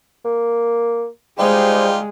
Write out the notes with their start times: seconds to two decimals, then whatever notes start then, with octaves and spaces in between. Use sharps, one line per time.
0.25 A#3
1.39 G3 G#3 D#4 F4 G4 C5